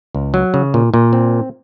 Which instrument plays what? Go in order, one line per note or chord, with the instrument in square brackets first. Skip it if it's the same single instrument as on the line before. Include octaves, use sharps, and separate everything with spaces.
[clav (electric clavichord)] C#2
F#3
C#3
A#2
A#2
C4